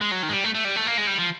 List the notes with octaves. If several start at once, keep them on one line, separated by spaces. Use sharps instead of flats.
G#3
F#3
D#3
G#3
G3
A3
A3
G3
A3
A#3
G#3
G3
F3